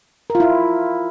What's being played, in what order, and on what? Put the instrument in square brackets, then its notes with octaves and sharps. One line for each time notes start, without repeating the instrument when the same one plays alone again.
[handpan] A#4
F4
E4